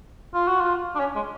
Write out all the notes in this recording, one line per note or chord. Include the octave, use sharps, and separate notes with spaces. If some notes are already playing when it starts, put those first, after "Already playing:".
F4
F#4
F4
D4
C#4
G#3